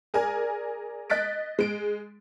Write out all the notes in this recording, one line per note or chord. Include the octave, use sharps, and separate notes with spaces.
G#4 A#4 D5 G#5
D#5 F#6 A6 B6 D7
G#3 D7